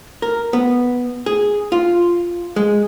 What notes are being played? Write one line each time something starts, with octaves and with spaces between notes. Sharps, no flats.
A#4
B3
G#4
F4
G#3